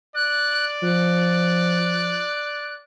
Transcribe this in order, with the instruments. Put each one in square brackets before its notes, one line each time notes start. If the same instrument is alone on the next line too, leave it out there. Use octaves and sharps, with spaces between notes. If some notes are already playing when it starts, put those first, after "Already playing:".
[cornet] D5 [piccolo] F#6
[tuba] F3 [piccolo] F#6